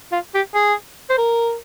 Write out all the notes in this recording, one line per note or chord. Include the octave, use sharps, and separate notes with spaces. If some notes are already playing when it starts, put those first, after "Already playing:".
F4
G4
G#4
C5
A#4